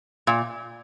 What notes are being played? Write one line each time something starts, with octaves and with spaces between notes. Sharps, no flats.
A#2